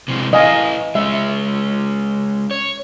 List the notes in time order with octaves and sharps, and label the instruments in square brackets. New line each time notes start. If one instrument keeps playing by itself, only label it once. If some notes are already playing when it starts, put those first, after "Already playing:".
[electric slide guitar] C3 E3 G#3
[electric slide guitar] E3 A3 E4 [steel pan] D#5 F5 G#5
[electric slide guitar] G#3 C#4 [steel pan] E5
[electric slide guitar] C#5